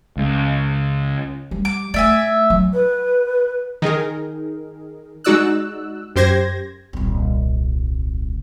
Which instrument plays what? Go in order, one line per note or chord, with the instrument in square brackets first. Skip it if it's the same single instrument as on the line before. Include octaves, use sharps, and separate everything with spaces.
[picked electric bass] C#2
[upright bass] G3
[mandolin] D6
[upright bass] A3 [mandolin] D5 E5 G#5
[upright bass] F#3
[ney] B4
[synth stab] D#3 D#4 G#4 A#4
G#3 D#4 F#4 D5 E6 F#6
F#2 G4 C5 G#6 A#6
[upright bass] D#1 C2